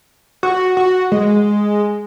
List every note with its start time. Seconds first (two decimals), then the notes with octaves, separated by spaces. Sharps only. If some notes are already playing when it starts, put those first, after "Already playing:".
0.43 F#4
0.77 F#4
1.12 G#3